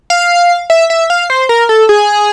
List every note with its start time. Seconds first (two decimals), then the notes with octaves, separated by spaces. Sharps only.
0.10 F5
0.70 E5
0.90 E5
1.10 F5
1.30 C5
1.49 A#4
1.69 A4
1.89 G#4